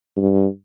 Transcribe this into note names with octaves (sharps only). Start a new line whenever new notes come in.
G2